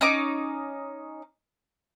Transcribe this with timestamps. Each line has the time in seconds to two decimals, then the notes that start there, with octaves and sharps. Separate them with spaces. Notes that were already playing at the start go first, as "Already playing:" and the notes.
0.01 C#4 D#4 D6